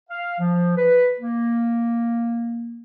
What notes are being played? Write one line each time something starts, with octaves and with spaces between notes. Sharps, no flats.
F5
F3
B4
A#3